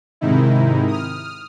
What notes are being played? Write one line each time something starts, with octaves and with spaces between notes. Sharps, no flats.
G#2 C3 D#3 D#4 E4
D#6 F6